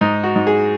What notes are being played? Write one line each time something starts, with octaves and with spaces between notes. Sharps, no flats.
G#2 D#4
F#4
G#2
G#4